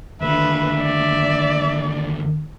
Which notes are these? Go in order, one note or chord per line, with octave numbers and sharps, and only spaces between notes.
D#2 D3 B4 E5
D5